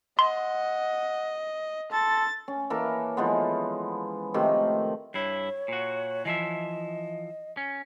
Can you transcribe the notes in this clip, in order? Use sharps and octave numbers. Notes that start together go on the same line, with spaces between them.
D#5 F#5 C6
A4 C6 A6
C#4
E3 A#3 A4 A#4
E3 F3 G#3 B3
C3 D#3 F3 A3
G2 E4 C#5
A#2 F#4
E3 F3 D#5 E5
C#4